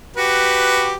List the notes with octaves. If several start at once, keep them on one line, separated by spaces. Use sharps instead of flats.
F#4 G4 B4